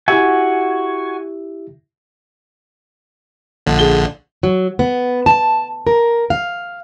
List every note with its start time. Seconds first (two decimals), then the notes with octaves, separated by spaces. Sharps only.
0.08 E4 F#4 G4 E5 G#5
3.66 A#1 D3
3.79 G#4 G7
4.43 F#3
4.79 B3
5.26 A5
5.87 A#4
6.30 F5